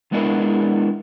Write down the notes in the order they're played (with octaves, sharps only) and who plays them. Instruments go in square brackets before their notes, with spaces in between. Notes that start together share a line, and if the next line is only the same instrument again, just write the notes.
[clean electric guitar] G#3 B3 D4 E4 A#4